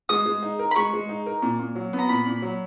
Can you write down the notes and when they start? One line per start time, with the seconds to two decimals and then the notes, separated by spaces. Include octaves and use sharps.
0.09 G#3 D#6
0.26 G#3
0.43 D#4
0.59 A#4
0.71 B5
0.76 G#3 C#6
0.93 G#3
1.09 D#4
1.26 A#4
1.42 A#2
1.60 A#2
1.75 F#3
1.93 B3
1.99 A#5
2.09 A#2 B5
2.26 A#2
2.42 F#3